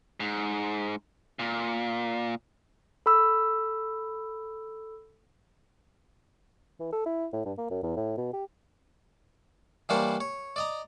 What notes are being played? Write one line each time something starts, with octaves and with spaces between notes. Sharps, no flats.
G#2
A#2
A4 B5 E6
E3
A4
E4
A2
G2
A#3
F#2
E2
A2
B2
G4
E3 G3 A#3 D4 C5 C#5
C#5
D5 D#5 A#5